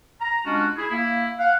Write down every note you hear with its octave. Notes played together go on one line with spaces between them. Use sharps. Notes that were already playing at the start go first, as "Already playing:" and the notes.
A#5
G#3 C#4 D4 F4 F#4
E4 G#4
A#3 E4
F5 F#5